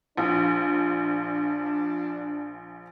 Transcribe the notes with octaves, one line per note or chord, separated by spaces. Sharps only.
A#1 F3 D4 F4